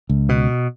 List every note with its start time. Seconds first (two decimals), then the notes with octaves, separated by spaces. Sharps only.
0.09 C#2
0.29 B2